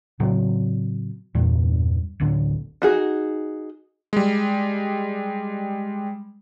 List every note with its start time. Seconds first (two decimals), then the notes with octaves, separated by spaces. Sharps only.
0.20 A2 C#3 F#3 C4
1.35 E2 G2 A#2
2.20 D1 A1 D3
2.82 D#4 F#4 G#4
4.13 G3 G#3